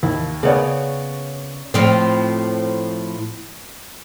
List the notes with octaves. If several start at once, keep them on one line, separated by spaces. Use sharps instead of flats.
D#2 E4
C#3 B3 A#4 C#5 D5
A2 F3 C4